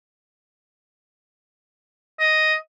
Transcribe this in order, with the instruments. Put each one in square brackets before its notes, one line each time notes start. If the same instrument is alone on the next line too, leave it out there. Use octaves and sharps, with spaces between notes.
[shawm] D#5